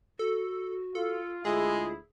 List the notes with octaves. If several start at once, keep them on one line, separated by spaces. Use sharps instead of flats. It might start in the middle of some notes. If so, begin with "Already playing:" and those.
F#4 A4
F4 A4
D2 G#3 E4 F4 G#4